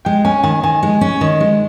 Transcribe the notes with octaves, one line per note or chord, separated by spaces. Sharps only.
G#3 G5
C#4 G#5
D#3 G#5
D#3 G#5
G#3
C#4
D#3 D#5
G#3